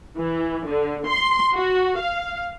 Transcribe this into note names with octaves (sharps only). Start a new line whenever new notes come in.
E3
D3
C6
F#4
F5